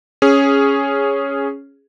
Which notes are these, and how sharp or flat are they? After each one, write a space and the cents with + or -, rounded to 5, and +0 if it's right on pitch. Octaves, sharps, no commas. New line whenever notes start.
C#4 +0 G#4 +0